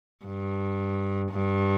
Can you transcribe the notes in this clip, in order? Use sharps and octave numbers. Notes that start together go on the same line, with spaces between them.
G2
G2